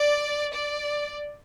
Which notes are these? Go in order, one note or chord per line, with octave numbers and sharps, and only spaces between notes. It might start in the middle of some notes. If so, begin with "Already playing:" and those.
Already playing: D5
D5